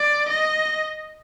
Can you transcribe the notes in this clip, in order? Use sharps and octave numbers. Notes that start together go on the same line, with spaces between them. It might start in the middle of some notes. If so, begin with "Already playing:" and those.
Already playing: D5
D#5